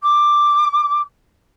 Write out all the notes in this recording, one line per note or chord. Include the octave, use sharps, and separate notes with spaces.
D6